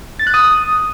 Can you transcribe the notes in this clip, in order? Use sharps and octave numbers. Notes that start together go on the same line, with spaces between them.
A6
F#6
D#6